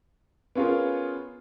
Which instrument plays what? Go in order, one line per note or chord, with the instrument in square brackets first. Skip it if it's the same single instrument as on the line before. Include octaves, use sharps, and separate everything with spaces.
[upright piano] B3 C#4 F4 G#4 A#4